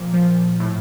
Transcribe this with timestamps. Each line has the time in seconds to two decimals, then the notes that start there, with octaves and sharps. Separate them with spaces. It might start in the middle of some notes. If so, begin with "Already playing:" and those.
Already playing: A#2 F3
0.13 F3
0.60 A2